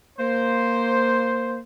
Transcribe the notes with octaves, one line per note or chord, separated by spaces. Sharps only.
A#3 C5